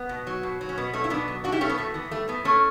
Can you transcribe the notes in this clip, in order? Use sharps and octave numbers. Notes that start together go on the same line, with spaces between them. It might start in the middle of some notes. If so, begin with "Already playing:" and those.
Already playing: B3
B2
F#3
B2
F#3
C#4
B2 B3
F#3 A3 C#4
E4
B2 B3 D4
F#3
B2 D4 F#4
E4 G4
F#3 A3 C#4
B3
A2 A3
E3 B3
G3 A3
A2 B3
A2 A3 C#4